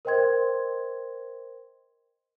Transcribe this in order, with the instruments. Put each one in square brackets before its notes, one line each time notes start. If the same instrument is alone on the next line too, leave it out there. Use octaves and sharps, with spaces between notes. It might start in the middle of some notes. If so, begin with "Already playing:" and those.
[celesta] A#4 C5 D#5 G5 C6 G#6